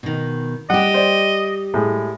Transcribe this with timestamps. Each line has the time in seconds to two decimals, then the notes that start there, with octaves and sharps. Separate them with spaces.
0.03 B2 D#3
0.70 G3 G4 D#5 F#5
0.94 C5 D5
1.74 A2 G#3